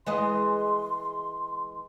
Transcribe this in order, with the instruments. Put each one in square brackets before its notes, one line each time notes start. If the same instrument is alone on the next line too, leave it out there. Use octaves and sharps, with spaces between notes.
[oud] E3 G#3 D#5 [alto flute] C6